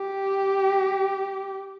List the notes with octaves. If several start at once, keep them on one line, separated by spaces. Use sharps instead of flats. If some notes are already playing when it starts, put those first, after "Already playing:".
Already playing: G4